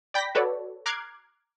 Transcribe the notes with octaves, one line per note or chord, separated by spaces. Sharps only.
D5 G5 B5 G6 A#6 B6
F#4 A4 B4 C#5 D5
A#5 D6 F6 F#6 G#6 C7